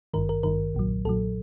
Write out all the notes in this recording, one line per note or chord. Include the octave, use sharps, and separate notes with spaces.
G#1 G2 D#3 A#4
A#4
G#1 G2 D#3 A#4
B1 A#2 F#3
B1 A#2 F#3 A4